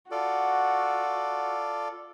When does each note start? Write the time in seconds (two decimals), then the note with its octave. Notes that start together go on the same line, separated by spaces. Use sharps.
0.11 F4 F#4 A4 D5